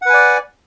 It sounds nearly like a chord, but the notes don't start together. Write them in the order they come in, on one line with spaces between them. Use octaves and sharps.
F#5 B4 G#5 D5